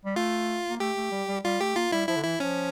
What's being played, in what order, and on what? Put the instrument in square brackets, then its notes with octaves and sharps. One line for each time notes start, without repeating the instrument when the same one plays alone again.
[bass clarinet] G3
[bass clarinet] A3 [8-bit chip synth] F4
[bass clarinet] A#3
[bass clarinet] A3 [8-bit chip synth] G4
[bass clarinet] A3
G3
G3
[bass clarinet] G3 [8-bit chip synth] F4
[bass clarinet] A3 [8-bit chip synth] G4
[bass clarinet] A#3 [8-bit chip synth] F4
[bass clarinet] G3 [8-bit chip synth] E4
[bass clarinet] F3 [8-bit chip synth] E4
[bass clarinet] D3
[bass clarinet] E3 [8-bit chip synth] E4
[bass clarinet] F3 [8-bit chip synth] C#4